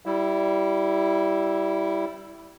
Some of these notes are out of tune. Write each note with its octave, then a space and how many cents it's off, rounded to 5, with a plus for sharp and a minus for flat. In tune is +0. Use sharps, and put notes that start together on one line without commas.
G3 -15 E4 +0